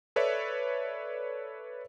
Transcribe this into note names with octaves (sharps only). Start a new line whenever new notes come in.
A4 B4 C#5 D5 E5